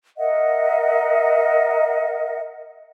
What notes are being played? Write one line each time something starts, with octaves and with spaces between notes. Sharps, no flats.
A#4 D#5 E5 F#5